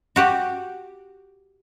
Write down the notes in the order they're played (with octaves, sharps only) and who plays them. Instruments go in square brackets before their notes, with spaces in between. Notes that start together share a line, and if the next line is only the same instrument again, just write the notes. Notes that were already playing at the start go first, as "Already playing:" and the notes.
[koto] F#4 G4 F#5